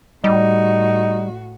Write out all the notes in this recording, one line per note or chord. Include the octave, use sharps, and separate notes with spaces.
A2 G3 D#4 F#4